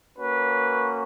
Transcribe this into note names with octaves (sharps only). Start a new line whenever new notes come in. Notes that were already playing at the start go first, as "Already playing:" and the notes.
A#3 C#4 F#4 B4